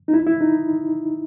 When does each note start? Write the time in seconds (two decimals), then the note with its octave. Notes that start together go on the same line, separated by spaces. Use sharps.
0.08 D#4
0.14 E4
0.27 E4
0.41 D#4